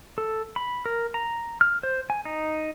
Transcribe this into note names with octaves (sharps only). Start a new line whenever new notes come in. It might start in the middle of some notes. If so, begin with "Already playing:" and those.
A4
B5
A#4
A#5
F6
C5
G#5
D#4